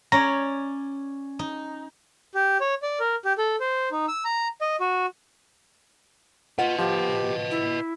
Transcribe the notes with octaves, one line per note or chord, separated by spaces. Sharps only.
C#4 C#5 D5 A#5
D#4
G4
C#5
D5
A#4
G4
A4
C5
D#4
E6
A#5
D#5
F#4
F4 B4 D#5 F#5
F3 G4
E4